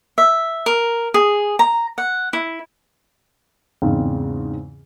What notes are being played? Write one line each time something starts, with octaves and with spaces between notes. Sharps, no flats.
E5
A#4
G#4
A#5
F#5
E4
E2 G#2 C#3 G#3 C4 F5